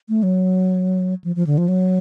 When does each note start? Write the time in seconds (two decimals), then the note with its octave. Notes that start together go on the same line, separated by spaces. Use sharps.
0.09 A3
0.23 F#3
1.24 F3
1.36 F3
1.47 D3
1.58 F3
1.68 F#3